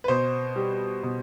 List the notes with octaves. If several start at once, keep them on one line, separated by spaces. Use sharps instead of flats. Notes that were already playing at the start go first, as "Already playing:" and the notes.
B4
B2 C5
G3
B2